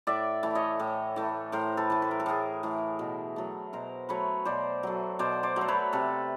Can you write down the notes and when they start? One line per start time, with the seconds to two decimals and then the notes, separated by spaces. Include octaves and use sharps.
0.07 A2 D5 E5
0.43 E3 A3
0.55 C#5 D#5
0.80 A2
1.16 E3 A3
1.52 A2 A#4 C5
1.77 A4 B4
1.90 E3 A3
2.02 B4
2.11 A#4
2.20 A4
2.26 A2 G#4 A#4
2.63 E3 A3
2.99 B2
3.36 F#3 A3
3.73 B2 A#4 C5
4.09 F#3 A3 B4 C#5
4.45 B2 C5 D5
4.83 F#3 A3
5.19 B2 C5 D5
5.43 C5 D5
5.56 F#3 A3 C5
5.68 B4 C#5
5.93 C3 A4 B4